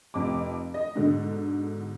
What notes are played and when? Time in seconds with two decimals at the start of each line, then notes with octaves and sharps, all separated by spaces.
0.14 F1 F2 D6
0.74 D#5
0.95 G#2 B2 D3